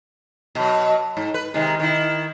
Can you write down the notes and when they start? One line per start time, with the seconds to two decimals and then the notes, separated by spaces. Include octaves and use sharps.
0.55 B2 F#3
1.17 G#2
1.34 B4
1.54 C3 D#3 G#3
1.79 D#3 E4